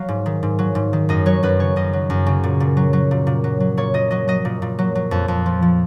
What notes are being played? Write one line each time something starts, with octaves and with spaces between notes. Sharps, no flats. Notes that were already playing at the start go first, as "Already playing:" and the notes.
Already playing: F#3 F5
G#2
D#3
G#2
F#3
G#2
D#3
F#2 D#5
F#3 C#5
F#2 B4
C#3 C#5
F#2 D#5
F#3
F#2
C#3
A#2
A#2
F#3
F#3
A#2
A#2
F#3
F#3
A#2 C#5
A#2 D#5
F#3 D#5
F#3 D#5
A#2
A#2
F#3
F#3
F2
F2
F3
F3